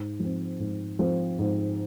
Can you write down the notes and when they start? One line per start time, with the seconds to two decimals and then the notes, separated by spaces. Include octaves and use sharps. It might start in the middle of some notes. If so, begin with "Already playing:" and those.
Already playing: G#2
0.20 F3 C4
0.59 G#2
0.99 F3 C4
1.38 G#2